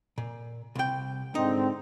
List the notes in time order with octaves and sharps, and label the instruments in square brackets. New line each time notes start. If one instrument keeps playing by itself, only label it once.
[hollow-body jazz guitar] A#2
C2 G5
[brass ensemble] G#2 D3 C4 [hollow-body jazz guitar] D#4